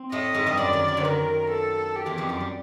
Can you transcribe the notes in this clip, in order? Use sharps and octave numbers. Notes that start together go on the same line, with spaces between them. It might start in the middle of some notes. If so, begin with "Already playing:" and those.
Already playing: C4
A2 A3 D#5
G#2 G#3
G2 G3
F#2 F#3 D5
D#3
D#3
D3
D#3 A#4
A4
G4
E2 E3
F2 F3
F#2 F#3
G3